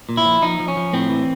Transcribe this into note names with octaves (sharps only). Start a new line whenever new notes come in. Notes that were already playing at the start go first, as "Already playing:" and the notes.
A#2
E4
F3
F3 D#4
F3
C#4
F3
A2 C4
E3